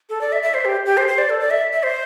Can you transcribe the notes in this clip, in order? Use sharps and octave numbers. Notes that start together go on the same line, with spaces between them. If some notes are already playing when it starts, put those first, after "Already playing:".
A4
D5
E5
E5
C5
G4
G4
C5
C5
D5
A4
D5
E5
E5
C5